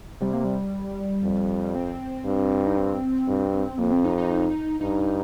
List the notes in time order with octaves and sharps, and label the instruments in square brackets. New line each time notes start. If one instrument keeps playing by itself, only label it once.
[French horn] C3 [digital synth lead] G3
[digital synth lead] A#3
G3
[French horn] F2
[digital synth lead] C4
[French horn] G2
[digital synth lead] D#4
C4
[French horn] G2
[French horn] F2 [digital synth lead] A#3
[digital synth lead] C4
D#4
D#4
[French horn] G2 [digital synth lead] D#4